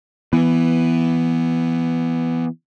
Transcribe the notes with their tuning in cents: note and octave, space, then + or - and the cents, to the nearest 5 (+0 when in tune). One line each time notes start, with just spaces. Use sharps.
E3 +10 B3 +0